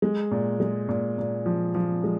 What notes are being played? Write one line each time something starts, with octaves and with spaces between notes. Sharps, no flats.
G#3
A#2
G#3
A#2
A#2
F3
F3
G#3